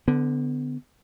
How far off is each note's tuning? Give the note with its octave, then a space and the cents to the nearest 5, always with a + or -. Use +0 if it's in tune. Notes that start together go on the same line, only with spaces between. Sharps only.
D3 +0 B3 +25